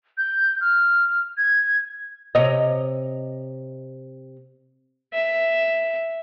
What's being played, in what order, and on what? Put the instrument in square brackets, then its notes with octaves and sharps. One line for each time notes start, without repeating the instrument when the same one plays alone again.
[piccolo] G6
F6
G#6
[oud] C3 C#5 D#5
[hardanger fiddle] E5